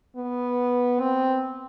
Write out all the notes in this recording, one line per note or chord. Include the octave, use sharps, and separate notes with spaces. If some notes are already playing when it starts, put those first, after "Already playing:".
B3
C4